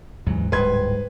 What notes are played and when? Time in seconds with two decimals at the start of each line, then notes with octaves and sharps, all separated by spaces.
0.26 D#2 G#2 C#3 E3 F#3
0.52 D1 G#2 G3 B4 C6 G#6